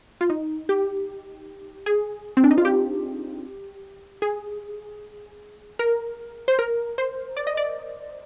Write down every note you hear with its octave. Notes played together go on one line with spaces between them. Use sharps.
F4
D#4
G4
G#4
C4
D4
D#4
F4
G4
G#4
A#4
C5
A#4
C5
D5
D#5
D5